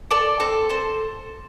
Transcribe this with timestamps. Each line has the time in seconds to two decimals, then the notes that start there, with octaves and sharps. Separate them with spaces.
0.11 A4 D5
0.40 C4 A4
0.69 A4 C5